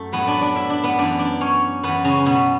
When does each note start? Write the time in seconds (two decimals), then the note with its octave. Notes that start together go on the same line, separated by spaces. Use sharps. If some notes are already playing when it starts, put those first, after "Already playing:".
Already playing: F#2 A3 A4
0.12 A2 F#3 B3 B4
0.27 D4 D5
0.41 D4 D5
0.55 E4 E5
0.70 D4 D5
0.84 B3 B4
0.98 F#2 E3 D4 D5
1.19 D4 D5
1.41 C#4 C#5
1.83 F#2 E3 B3 B4
2.04 C#3 C#4
2.26 B2 B3